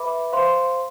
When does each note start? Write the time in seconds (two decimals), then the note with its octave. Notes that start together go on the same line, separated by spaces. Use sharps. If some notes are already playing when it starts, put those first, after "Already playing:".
Already playing: B4 E5 B5 D6
0.32 C5 F5 C6